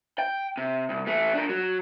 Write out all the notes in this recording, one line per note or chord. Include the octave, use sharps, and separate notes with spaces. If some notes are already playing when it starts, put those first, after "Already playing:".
G5
C3
C2
E3 A3
D4 A#4
F#3